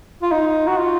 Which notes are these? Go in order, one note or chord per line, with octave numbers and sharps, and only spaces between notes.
F4
D#4
F#4
F4